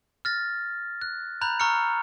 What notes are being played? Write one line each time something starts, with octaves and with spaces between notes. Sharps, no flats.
F6 A6 A#6
F#6
A#5 B5 F#6 G6 F7
A#5 C#6 E6 F6 C#7